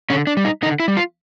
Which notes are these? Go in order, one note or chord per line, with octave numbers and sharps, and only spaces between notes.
D3 C#4
D4
G3
D#4
D3 D#4
E4
G3
F4